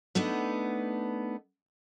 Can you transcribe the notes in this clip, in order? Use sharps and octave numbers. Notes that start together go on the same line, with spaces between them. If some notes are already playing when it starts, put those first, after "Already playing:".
A3 B3 D4 D#4